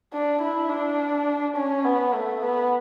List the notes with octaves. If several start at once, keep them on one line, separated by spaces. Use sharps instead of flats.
D4
E4
D4
C#4
B3
A3
B3